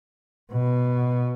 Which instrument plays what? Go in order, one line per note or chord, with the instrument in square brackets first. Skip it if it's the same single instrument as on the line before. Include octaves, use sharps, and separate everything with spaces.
[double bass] B2